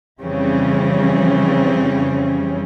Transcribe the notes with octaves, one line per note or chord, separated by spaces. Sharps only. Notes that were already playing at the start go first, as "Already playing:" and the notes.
F2 C#3 E3 G3 C4 C#4